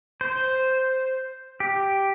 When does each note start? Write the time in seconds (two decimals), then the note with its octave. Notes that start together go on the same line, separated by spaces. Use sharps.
0.21 C5
1.60 G4